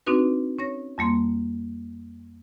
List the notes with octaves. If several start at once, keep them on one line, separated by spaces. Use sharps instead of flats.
C4 D4 D#4 F#4 B4
C#4 C#5 A#6
F2 G3 A#3 C6